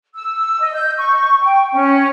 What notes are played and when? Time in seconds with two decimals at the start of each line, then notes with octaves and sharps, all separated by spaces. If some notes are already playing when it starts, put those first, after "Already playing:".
0.14 E6
0.60 D#5
0.74 G6
0.97 C#6
1.41 G5
1.72 C#4